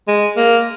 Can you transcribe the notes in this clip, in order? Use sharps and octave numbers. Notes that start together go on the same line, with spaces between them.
G#3
A#3